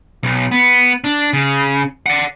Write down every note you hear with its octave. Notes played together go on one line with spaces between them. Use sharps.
B1
B3
D4
C#3
D5 F#5